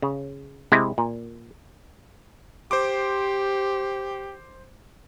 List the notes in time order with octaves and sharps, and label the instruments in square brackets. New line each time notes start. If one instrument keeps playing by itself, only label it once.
[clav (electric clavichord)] C#3
C3 G#3 C4 E4
A#2
[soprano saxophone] G4 [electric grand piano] C5 C6 D6